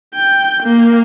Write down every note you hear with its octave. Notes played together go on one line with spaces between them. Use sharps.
G5
A#3